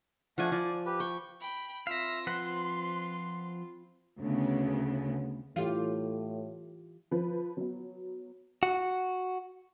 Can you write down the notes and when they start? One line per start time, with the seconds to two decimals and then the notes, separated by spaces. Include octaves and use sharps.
0.38 F3 A3 D4 F#5 G#5
0.52 F3 D5
0.86 G4 B4
1.00 G5 C#6
1.40 G5 B5
1.87 C4 F4 E5 F5 E6 A#6
2.27 F3 B4 F#5 C6
4.18 D2 C#3 B3
5.56 A2 E3 F4 G4
7.11 F3 B4
7.57 F#3 B3
8.63 F#4